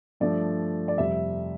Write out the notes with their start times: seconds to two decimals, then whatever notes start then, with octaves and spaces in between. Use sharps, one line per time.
0.20 G2 F3 A3 D5
0.88 D5
0.98 F2 C3 G3 E5